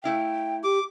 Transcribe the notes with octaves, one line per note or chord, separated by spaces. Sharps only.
A3 E4 F5 G5
G4 D6